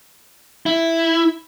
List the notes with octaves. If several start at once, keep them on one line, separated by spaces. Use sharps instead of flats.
E4